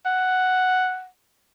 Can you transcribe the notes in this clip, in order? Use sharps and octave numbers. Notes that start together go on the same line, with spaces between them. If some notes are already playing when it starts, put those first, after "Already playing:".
F#5